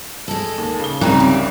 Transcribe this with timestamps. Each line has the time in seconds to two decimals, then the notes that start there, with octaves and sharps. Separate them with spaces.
0.28 G#3 A4
0.58 D#2
0.80 C#3 G7
1.01 C2 C#3 C4 D#4
1.20 G4